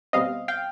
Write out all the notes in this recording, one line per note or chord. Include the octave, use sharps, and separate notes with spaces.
B2 G3 C4 D#5 F5
F5 G5